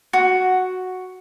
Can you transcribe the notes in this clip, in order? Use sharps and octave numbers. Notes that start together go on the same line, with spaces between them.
F#4